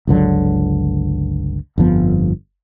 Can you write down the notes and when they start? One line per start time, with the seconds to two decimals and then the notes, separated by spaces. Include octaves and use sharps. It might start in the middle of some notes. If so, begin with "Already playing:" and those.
0.07 G1 C#2 D3 F#3
1.78 G1 F2 F3 B3